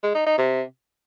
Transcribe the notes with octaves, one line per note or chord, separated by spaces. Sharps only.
G#3
D#4
D#4
C3